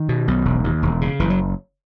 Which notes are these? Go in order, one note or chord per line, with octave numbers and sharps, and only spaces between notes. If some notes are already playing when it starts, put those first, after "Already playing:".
Already playing: D#3
B2
B1
E1
D#2
E1
C#3
F#1 E3
F#3